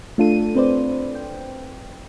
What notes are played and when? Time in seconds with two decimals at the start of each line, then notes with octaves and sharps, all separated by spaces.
0.18 A3 D4 F4 A4 D#7
0.55 C4 B4 C5 D5
1.15 G5